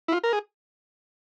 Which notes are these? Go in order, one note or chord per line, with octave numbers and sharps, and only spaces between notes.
E4
F4
A#4
G#4